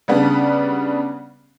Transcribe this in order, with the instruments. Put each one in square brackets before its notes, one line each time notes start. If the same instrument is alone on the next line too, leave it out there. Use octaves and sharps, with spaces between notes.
[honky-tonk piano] C#3 G3 B3 D4